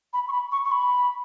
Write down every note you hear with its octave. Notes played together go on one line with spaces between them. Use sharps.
B5
C#6
B5
C#6
C#6
B5